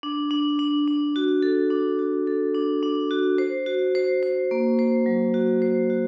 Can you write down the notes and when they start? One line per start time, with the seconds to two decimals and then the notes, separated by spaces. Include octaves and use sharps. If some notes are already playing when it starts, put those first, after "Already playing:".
0.03 D4
0.31 D4
0.59 D4
0.88 D4
1.16 F#4
1.43 A4
1.70 D4
1.99 F#4
2.27 A4
2.54 D4
2.83 D4
3.11 F#4
3.38 C5
3.66 F#4
3.95 C5
4.23 C5
4.51 A#3
4.79 C5
5.06 F#3
5.34 F#4
5.62 C5
5.90 F#4